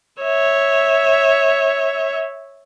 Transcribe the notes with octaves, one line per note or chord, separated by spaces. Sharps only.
C#5 E5